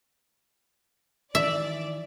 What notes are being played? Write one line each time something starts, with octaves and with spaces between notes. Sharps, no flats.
D#3 E3 D5 E5